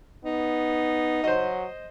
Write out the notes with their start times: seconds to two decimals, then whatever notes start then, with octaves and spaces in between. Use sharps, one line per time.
0.25 B3 D#4
1.24 F#3 C5 D#5